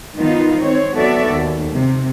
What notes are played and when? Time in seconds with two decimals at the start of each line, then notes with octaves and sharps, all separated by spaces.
0.16 D#3 B3 D#4 F4
0.59 C4 C#5
0.94 F#3 B3 F#4 A4 D5 E5
1.29 D#2
1.75 C3